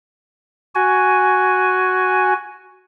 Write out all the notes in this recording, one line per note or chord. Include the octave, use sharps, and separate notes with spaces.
F#4 G#5